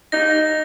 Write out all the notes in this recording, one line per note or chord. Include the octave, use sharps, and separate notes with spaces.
D#4 A#6
A#6